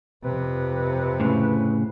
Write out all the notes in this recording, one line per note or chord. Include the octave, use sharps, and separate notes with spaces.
F2 C3 B4
A2 C#3